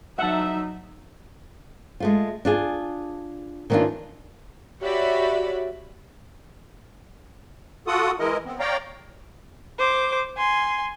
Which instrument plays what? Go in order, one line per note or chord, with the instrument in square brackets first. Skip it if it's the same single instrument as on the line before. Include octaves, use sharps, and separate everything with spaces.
[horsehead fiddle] F#3 D#4 [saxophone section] E5 [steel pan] F#5 A5
[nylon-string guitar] G#3 A3 F4
D4 F4 G#4
D#3 E3 B3 C#4 D4 F4
[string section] F#4 G4 C#5 D5 E5 B5
[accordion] F4 F#4 A4 F#5 D#6
E3 G#3 E4 A#4 D#5
B3 C4
C#5 D5 F5 G5 A#5
[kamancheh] C5 D6
G#5 C6